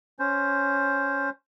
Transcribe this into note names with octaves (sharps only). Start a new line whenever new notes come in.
C#4 C5